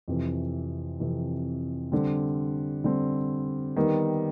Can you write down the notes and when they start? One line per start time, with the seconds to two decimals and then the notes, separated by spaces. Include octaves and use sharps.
0.08 F2 C3 E3
1.00 F2 C3 E3
1.92 D3 G3 C4
2.84 D3 G3 C4
3.77 D#3 G3 B3 D#4 G4